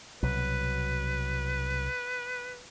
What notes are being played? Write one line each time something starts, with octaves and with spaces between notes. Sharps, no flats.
C2 B2 F#3 B4